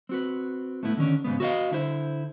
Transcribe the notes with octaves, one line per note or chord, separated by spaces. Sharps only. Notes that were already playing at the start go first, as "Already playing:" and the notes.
C4 F#4 B4
A2 A3 B3 E4
D3 D#3 C#4 D4
G#2 C#3 B3
F#4 A4 B4 C#5 D#5 F5
D3 E4 C5